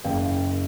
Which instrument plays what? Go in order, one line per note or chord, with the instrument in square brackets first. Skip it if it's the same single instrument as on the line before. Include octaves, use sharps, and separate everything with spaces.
[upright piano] F#1 F5 G5